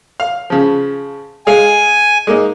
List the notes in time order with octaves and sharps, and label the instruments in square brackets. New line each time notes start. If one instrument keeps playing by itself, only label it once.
[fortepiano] F5
C#3 F3
[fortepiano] G#3 G#4 F5 [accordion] G#5
[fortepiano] G#3 A#3 D#4